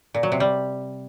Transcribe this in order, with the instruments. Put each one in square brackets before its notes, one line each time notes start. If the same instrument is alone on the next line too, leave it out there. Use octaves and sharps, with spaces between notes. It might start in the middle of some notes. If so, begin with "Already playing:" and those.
[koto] A#2
F#3
C3
G3